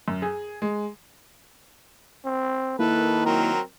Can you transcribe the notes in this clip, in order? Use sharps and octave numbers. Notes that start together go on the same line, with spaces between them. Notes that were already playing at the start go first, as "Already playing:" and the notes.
F#2
G#4
G#3
C4
D#3 A#3 E4 A4 B4
F#3 C4 A#4